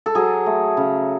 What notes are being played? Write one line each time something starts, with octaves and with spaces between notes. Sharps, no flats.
A4
F#3 G#4
A3
C#3